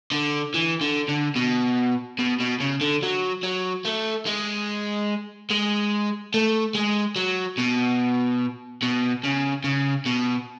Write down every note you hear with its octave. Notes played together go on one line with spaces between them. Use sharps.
D3
E3
D3
D3
B2
B2
B2
C#3
D3
F#3
F#3
A3
G#3
G#3
A3
G#3
F#3
B2
B2
C#3
C#3
B2